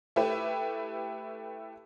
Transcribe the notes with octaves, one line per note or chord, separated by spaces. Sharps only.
A3 E4 G4 B4